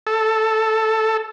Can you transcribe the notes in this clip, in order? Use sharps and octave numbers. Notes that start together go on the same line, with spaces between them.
A4